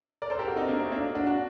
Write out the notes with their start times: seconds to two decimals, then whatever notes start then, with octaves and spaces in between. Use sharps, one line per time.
0.22 A#4 D5
0.30 A4 C5
0.39 G4 A#4
0.47 F#4 A4
0.56 C4 D#4
0.68 A#3 D4
0.80 A3 C4
0.92 A#3 D4
1.15 D4 F#4
1.26 D4 F#4